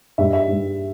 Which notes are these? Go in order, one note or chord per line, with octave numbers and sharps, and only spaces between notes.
G2 G3 E5
E5
G2 G3